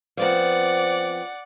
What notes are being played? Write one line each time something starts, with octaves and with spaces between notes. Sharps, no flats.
F3 B3 C4 D5 F#5